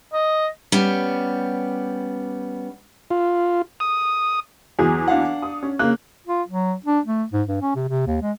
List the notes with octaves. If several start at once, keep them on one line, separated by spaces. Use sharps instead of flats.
D#5
G3 B3 C#4
F4
D#6
E2 F#3 G#4
D4 F5 F#5
D#6
C#4
C#3 A#3 F#6
F4
F#3
D4
A3
G#2
G2
C#4
C3
C3
D#2
G#3